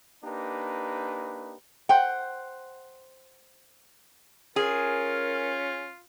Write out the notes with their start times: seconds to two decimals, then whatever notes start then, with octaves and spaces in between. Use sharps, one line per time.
0.24 A#3 D4 D#4 G4 B4
1.89 C5 F#5 G5
4.56 C#4 F4 G#4 A#4